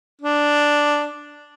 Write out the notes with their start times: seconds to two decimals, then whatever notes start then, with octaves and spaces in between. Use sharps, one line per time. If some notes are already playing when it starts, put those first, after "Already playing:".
0.21 D4